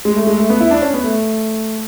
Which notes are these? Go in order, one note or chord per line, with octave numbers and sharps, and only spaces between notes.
G#3
A3
G#3
A3
B3
E4
D4
C#4
B3
A3